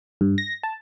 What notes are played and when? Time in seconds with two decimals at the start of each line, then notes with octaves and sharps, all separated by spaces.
0.21 G2
0.38 A#6
0.63 A5